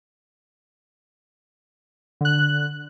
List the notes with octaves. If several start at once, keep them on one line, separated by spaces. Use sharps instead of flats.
D3 F#6